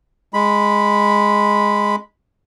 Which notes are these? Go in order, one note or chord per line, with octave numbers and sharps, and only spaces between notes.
G#3 B5